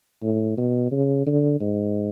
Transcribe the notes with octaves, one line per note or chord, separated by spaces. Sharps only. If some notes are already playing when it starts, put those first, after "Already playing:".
A2
B2
C#3
D3
G#2